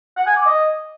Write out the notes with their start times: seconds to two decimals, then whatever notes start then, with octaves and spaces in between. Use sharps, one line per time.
0.17 F#5
0.27 G#5
0.36 D6
0.46 D#5